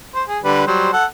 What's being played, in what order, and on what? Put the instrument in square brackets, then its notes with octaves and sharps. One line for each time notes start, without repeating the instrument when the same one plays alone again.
[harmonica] C5
G#4
D3 G3 B4
F#3 G3 C5
A4 F#5